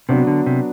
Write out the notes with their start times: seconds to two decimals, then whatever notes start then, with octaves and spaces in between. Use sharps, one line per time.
0.09 C3 F#3 B3 D4 F#4
0.27 D3
0.46 C3